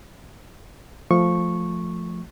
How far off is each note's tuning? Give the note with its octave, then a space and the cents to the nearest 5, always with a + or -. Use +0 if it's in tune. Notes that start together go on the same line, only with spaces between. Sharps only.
F3 +0 A3 +0 C#6 -10